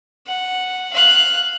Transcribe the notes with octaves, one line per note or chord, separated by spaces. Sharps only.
F#5
F5 F#6